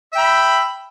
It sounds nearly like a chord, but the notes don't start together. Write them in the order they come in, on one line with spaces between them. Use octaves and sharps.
E5 G5 B5